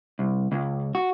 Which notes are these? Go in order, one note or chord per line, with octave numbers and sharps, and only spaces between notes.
C2
C#2
F#4